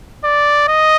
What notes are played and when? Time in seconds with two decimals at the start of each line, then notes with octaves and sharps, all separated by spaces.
0.24 D5
0.68 D#5